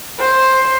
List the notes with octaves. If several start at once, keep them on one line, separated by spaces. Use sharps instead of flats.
C5